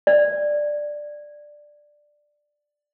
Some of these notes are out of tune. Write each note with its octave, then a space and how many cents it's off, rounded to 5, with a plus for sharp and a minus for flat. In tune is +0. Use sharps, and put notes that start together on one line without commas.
D5 +5